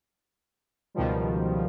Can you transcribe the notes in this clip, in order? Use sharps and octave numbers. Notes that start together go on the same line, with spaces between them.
C#2 B2 D#3 F3 G3